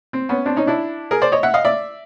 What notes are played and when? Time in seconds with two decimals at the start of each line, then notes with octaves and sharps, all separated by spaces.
0.13 C4
0.29 B3 C#4
0.46 C4 D4
0.56 C#4 D#4
0.67 D4 E4
1.11 G#4 A#4
1.22 C5 D5
1.32 C#5 D#5
1.43 E5 F#5
1.54 D#5 F5
1.65 D5 E5